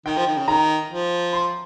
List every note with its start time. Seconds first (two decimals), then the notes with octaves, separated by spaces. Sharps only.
0.06 D#3 G5
0.17 F3
0.27 D#3
0.38 C#3
0.48 D#3 A#5
0.91 F3
1.33 C6